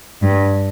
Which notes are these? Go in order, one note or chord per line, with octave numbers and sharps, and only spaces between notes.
G2